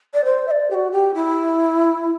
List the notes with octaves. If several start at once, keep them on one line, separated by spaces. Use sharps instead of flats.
D5
C5
E5
D5
G4
F#4
G4
E4